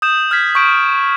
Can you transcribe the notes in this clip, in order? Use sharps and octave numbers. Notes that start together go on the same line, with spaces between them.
D#6 G6 E7
F6 G6 G#6 B6
C#6 G6 D7